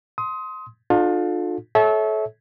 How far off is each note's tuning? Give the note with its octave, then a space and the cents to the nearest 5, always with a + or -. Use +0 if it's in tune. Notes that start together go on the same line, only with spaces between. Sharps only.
C6 +0 D#6 +25
D4 +45 F4 +30 A4 -15
A4 -30 C#5 +0 E5 -20